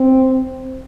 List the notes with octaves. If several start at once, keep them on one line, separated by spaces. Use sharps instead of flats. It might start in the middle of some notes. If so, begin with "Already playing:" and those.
Already playing: C4